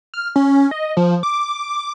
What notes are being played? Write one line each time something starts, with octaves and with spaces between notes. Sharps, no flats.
F6
C#4
D#5
F3
D6